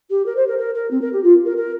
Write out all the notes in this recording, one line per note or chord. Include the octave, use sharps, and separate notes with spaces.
G4
A#4
C5
A#4
A#4
A#4
C4
A#4
G4
F4
A#4
A#4